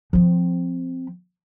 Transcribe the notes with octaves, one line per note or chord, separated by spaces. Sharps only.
F3 C4